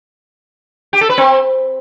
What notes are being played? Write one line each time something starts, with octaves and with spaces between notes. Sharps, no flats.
G4
A4
B4
C4